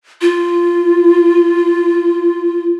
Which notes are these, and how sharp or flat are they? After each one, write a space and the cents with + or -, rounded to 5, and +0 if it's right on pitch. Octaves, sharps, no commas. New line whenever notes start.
F4 -15